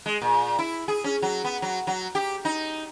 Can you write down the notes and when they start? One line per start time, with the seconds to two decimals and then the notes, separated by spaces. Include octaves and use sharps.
0.06 G#3
0.22 A#2
0.59 E4
0.88 G#4
1.04 C#4
1.22 F#3
1.44 B3
1.62 F#3
1.87 F#3
2.15 G4
2.45 D#4